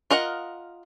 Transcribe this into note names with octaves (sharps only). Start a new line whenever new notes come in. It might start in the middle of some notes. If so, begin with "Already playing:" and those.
F4 A#4 D#5 F#5